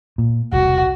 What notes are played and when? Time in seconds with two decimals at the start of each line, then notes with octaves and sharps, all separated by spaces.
0.18 A#2
0.52 E1 C2 F#4